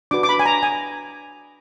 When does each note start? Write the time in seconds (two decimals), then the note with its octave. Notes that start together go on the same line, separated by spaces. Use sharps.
0.11 D4 F#4 B4 D6
0.23 D6
0.29 B5
0.40 G#5
0.45 A#5
0.63 G#5